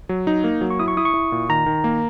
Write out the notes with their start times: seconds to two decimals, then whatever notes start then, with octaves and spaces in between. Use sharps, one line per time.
0.09 F#3
0.27 D#4
0.44 A#3
0.61 F#3
0.70 C#6
0.80 E4 D#6
0.88 C#6
0.97 E4 D#6
1.05 C#6
1.14 E4
1.32 A#2
1.49 D#3 A#5
1.66 D#3
1.84 A#3